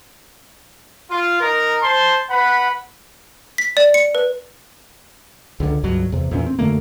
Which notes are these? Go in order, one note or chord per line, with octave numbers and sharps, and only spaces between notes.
F4
D#4 A#4
C5 A5 C6
B4 F#5 B5
B6
D5
C#7
B4
C#2 D3
C#2 G2 F#3
E2 C3
E2 A#2 C#4
C4
F#2 D3 A3 A#3